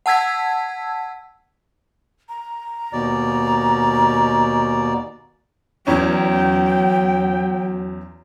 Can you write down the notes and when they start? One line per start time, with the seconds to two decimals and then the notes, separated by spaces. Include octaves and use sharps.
0.06 F#5 A5 E6 G#6 B6
2.29 A#5
2.93 D#2 B2 D5
5.87 E2 F#3 C#4 G5